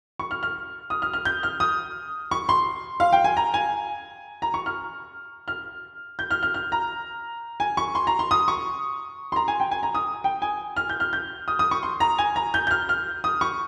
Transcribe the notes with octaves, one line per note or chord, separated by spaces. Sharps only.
C#6
F6
F6
D#6
F6
F6
G6
F6
D#6
C#6
C6
F5
G5
G#5
A#5
G#5
A#5
C#6
F6
F6
G6
F6
F6
F6
A#5
G#5
C#6
C6
A#5
C6
D#6
C#6
C6
A#5
G#5
G5
G#5
A#5
D#6
G5
G#5
F6
G6
F6
G6
D#6
D#6
C#6
C6
A#5
G#5
A#5
G6
G6
F6
F6
D#6
C#6